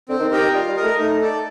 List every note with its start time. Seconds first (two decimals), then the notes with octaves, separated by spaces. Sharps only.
0.09 D3 C4
0.20 D#3
0.31 D#3 G4 A#4 D#5 G5
0.42 D#3
0.53 G3 F4
0.68 G3
0.76 A#4 D#5
0.83 A3
0.98 A3 D#4
1.21 A4 D5